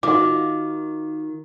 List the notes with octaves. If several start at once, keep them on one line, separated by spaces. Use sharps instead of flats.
D#3 F4 F#4 D6